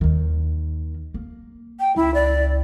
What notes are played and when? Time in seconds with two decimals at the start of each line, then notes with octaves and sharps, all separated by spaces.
0.01 D#2 D#3
1.14 A#3
1.80 G5
1.96 C#2 E4
2.14 D5